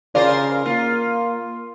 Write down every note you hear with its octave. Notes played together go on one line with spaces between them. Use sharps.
C#3 F4 A#4 C5 D5
A#3 F4